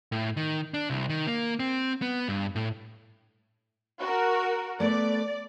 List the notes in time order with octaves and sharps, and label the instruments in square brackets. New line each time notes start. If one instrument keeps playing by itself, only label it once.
[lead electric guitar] A2
D#3
D4
C2
D#3
A#3
C4
B3
G2
A2
[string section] F#4 A#4
[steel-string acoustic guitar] A3 B3 B4 [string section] D5